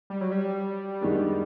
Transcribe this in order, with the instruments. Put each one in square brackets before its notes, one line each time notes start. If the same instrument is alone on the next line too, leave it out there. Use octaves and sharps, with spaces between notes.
[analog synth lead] G3
F#3
G3
[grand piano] F#2 D#3 G#3 B3 D4